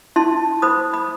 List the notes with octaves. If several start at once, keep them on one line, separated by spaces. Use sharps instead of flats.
E4 A5 C6
C5 B5 D#6
B5 D#6